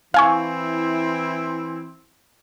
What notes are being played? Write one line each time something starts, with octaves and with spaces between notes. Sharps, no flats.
E3 C4 E4 F5 G#5 C#6